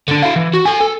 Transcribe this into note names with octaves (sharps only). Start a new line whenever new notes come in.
D3 D4
E4 F5
E3
F#4
A4 G#5
A4